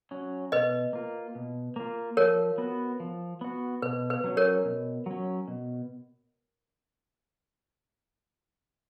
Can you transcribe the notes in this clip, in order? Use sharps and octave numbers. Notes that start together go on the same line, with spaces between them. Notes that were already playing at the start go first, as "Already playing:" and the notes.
F#3 C#4
B2 B4 D#5
A#3 F4
B2
A#3 F4
F3 A#4 C#5
B3 F#4
F3
B3 F#4
B2 B4
B4
F#3 C#4
A#4 C#5
B2
F#3 C#4
B2